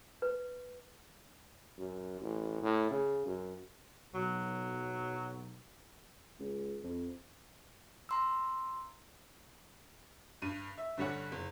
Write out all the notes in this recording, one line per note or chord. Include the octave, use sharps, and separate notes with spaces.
B4
F#2
A1
A2
C#3
F#2
B1 F#3
C#2
F2
A#5 C6 E6
G2 D#7
E5
G2 D3 G3 C#4 C#5 F#5
F#1